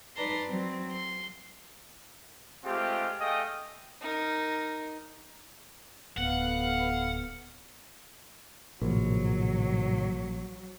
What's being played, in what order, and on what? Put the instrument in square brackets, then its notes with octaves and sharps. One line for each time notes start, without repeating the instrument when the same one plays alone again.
[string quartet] D#4 B4 D5 A5 A#5 C6
F#3 C4
C6
[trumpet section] G#3 A3 C4 F4 G4
A3 G#4 D#5 F5 G5 D#6
[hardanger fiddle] D#4 A#4
[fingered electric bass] D1 [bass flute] B3 [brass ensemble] A4 B4 F5 [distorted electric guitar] F#5
[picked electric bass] A#1 [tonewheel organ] A2 C3 D#3 [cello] F#3